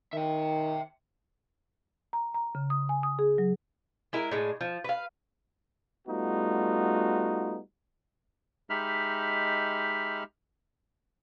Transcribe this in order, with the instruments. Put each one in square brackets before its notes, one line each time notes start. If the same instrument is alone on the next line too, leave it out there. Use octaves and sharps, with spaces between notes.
[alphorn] D#3 [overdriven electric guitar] E5 G5
[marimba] A#5
A#5
C#3
D#6
G#5
D#6
G#4
F#3
[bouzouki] G#3 E4 A#4
A2 G#3 D4
F3
B4 F5
[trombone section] G3 A3 B3 D#4 F4 F#4
[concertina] G#3 D#4 G4 E5 B5 F6